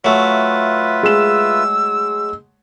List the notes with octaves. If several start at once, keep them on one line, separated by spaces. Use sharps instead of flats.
F#3 A3 F4 B4 E5
G#3 E6 E7